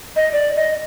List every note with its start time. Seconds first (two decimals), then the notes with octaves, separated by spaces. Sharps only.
0.16 D#5
0.33 D5
0.57 D#5